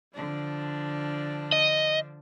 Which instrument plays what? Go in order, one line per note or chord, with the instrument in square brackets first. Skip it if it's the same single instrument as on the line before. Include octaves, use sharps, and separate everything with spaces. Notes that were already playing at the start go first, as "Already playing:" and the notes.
[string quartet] D3 F3 D4
[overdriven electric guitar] D#5